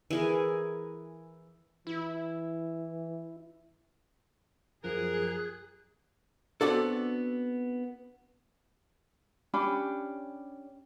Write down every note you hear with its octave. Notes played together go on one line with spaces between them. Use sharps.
E3 G#4 A#4
E3 E4
F#2 F3 F#3 G#4 A#4 F#6
B3 C4 D4 F#4 A4
C#4 D4 G4 B5